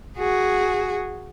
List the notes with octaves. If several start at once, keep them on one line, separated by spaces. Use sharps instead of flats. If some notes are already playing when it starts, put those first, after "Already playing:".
F#4 G#4